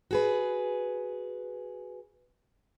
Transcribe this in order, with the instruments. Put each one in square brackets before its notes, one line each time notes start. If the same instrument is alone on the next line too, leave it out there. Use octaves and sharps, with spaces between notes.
[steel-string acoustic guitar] F#4 G#4 B4